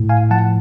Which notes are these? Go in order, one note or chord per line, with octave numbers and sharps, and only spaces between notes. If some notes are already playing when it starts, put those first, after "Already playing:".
Already playing: A2
F5 G#5
F3 F#5 A5